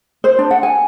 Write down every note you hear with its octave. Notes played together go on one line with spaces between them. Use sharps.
C5
D4
F#5
G#5